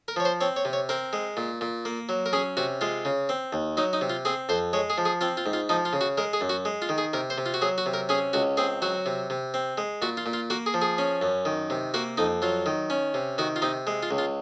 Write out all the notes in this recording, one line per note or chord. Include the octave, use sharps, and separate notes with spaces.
A#4
F3 C#5
C5
C4 C#5
C#5
C3
C#5
C4 A#4
G#3
A#2
A#2
A#3
F#3
A#4
C#4 G#4
C3 F#4
G#3 F4
C#3
C4
D#2
F#3 D#4
D#4
C3
F4
C4 G#4
F2 C5
G#3 C#5
G#4
F3
G#4
C4 F4
F4
G#2
F4
F3 D#4
F4
C#3
F#4
G#3 A#4
G#4
F#2
F#4
G#3
F4
D#3
G#4
C3 A#4
C5
C3
F4
F#4
F#3 G#4
F#4
C3
A#4
C#4 G#4
C#2 F#4
C4 G#4
F#3 F#4
C3
C3
C4
G#3
A#2 F#4
F4
A#2
F4
A#3 F#4
G#4
F3
G#4
C#4
F#2
D#3
C3
A#3 F#4
F2 D#4
F#3 F4
D#3
C#4
C3
D#3 F#4
F4
C3 D#4
G#3
F4
C#2
F4